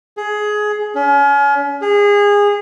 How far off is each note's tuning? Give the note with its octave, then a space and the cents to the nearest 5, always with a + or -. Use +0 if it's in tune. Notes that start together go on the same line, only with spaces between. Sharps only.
G#4 +15
C#4 +35
G#4 -25